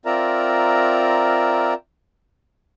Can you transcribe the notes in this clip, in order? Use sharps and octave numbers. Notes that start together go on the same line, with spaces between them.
C4 F4 A#4 D5 E5 A#5